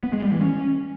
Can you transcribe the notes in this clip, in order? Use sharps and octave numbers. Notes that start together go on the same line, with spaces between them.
B3
G#3
G3
E3
C#4